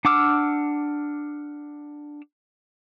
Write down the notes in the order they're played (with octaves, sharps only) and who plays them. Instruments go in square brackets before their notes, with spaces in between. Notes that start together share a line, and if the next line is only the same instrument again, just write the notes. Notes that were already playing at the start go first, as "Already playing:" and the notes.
[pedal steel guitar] D4 F#5 D6 E6 F6